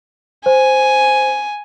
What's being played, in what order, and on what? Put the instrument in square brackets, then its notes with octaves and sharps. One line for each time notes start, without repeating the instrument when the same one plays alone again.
[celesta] C5 [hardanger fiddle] G#5